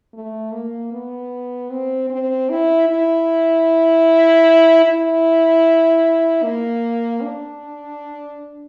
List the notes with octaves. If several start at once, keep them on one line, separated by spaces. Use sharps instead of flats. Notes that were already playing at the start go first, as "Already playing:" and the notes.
A3
A#3
B3
C4
C4
E4
E4
E4
A#3
D4